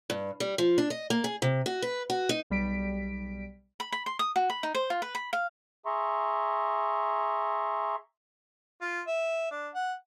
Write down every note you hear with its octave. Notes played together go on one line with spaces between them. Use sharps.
G2
G3
F3
D4
D#5
A#3
G#4
C3
F#4
B4
F#4
D#4
B1 G3 B6 D7
B5
B5
C6
D#6
F#4
B5
D#4
C5
F4
B4
B5
F5
G#4 E5 A#5 C6 C#6
F4
E5
D4
F#5